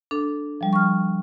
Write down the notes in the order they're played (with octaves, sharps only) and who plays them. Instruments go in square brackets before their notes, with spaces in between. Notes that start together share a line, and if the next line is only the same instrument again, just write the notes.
[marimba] D4 A4
F3 G3
C#6 F6